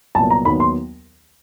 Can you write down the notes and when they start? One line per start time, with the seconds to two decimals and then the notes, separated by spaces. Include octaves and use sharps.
0.15 C2 A#2 F#3 B3 A5
0.30 A#5
0.45 D#2 D#3 F#3 B3 B5
0.60 C6